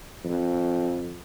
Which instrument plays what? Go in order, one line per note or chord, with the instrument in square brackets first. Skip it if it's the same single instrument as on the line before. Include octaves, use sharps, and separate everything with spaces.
[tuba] F2